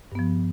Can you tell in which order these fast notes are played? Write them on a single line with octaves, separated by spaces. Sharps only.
G2 B3 F3